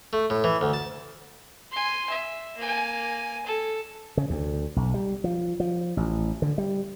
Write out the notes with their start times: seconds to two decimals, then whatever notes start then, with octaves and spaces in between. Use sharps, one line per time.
0.13 A3
0.30 A2
0.44 E3
0.61 D2
0.73 A5
1.72 G#5 C6
2.09 E5
2.57 A#3 G#5
3.46 A4
4.17 C#3
4.30 D2
4.76 B1
4.94 G3
5.24 F3
5.60 F3
5.97 A1
6.42 D3
6.58 G3